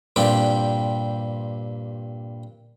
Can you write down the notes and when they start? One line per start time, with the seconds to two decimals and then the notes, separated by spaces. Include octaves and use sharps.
0.16 G2 A#2 G3 C4 G4